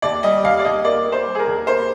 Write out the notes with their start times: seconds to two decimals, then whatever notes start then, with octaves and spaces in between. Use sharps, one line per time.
0.02 D#2 D5
0.23 G3 D#5
0.43 D#2 F5
0.59 D5
0.65 D#2 D#5
0.85 A#3 D5
1.05 A#3
1.12 C5
1.27 G3
1.35 G#4
1.39 A#4
1.47 D#2
1.67 A#3 C5